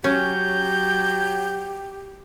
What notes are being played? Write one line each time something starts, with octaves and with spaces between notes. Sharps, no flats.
F#3 C#4 G4 G6